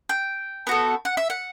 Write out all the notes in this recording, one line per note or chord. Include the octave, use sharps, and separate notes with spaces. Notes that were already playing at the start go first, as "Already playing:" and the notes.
G5
B3 F#4 A4
F#5
E5
F#5